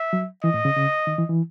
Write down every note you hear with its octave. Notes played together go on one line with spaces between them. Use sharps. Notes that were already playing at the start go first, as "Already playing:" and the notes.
Already playing: E5
F#3
E3 D#5
A2
C#3
C#3
D#3
E3
E3